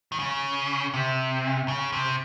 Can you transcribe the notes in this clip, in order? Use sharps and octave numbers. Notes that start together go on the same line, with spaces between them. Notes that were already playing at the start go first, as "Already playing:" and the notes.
D#3
C#3
C3
C#3
C3